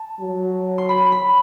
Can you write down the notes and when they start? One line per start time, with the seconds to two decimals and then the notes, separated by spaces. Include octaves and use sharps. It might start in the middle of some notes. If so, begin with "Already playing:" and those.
Already playing: A5
0.20 F#3
0.78 C6
0.89 B5
1.12 B5